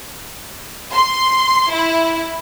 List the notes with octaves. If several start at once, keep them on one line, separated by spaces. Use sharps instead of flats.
C6
E4